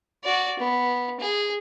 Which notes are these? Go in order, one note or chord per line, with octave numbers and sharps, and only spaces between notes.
F#4 D5
B3
G#4